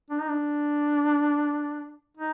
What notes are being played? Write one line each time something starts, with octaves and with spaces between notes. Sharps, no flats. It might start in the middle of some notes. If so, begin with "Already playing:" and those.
D4
D#4
D4
D#4